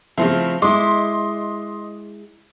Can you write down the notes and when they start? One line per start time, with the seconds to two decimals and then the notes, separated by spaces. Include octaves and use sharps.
0.18 C#3 F3 A3 C4 E4
0.62 G#3 E4 D#5 C6 D6